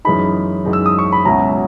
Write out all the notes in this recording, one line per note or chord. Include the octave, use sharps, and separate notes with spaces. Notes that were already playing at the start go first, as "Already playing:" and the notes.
F#2 E3 G#3 D#4 B5
F#2 E3 G#3 D#4
E6
D#6
C#6
B5
C#2 B2 F#3 C#4 E4 A#5